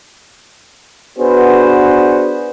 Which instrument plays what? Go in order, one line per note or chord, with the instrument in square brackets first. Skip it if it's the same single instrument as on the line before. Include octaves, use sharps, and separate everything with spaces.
[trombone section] B3 D4 F#4 G#4 B4 C5